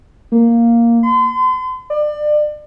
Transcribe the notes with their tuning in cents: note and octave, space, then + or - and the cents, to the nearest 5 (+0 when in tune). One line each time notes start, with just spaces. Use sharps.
A#3 +0
C6 -40
D5 +30